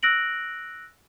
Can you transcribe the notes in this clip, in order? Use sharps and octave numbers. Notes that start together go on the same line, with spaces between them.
E6 F#6 A#6 D7 F#7